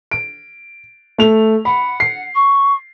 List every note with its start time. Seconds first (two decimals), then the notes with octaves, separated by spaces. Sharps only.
0.11 D7
1.18 A3 F7
1.65 F#5 B5
2.00 C7
2.35 C#6